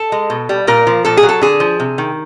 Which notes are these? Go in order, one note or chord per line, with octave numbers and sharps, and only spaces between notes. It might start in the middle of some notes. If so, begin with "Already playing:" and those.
Already playing: A4
G#3
B2
G3
A#2 A#4
F3
A#2 A4
G#4
F#3
A4
D3 G#4
F3
C3
D#3